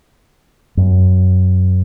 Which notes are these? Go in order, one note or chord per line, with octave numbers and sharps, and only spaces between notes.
F#2